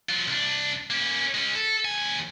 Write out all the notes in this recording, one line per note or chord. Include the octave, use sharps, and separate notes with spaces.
F#3 F4
C2 D4
A#3 C#4
G#3 C#4
A4
D#2 G#5